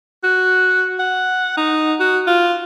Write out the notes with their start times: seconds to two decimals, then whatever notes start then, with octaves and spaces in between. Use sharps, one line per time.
0.24 F#4
0.99 F#5
1.57 D#4
2.00 F#4
2.27 F4